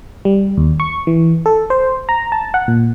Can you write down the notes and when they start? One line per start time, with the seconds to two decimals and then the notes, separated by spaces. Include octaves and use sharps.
0.25 G3
0.57 D#2
0.80 C#6
1.07 E3
1.46 A4
1.70 C5
2.09 A#5
2.32 A5
2.54 F#5
2.68 A#2